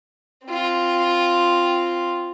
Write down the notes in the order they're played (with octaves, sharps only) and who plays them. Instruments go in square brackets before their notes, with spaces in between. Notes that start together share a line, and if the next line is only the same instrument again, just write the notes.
[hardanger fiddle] C4 F4